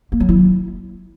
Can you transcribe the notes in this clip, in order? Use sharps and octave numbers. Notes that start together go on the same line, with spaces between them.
A#3
F#3
E4